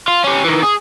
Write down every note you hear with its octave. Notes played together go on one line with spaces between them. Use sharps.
F4
C#4 G4
D#3 E3
G#4